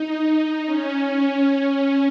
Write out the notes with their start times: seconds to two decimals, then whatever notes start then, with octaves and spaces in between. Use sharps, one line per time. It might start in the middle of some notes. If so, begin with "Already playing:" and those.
Already playing: D#4
0.65 C#4